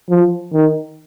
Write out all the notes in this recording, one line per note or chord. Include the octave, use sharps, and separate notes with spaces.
F3
D#3